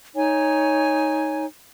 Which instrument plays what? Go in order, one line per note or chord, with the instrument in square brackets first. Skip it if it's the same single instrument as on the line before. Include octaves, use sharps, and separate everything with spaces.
[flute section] D#4 C#5 G#5